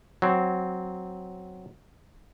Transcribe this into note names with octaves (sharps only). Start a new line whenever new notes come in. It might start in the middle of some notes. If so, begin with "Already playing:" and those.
F#3 C4